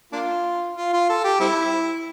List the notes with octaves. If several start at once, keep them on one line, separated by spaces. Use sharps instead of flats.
A#3 D4 F4
F4
F4
A4
G4
G3 C4 E4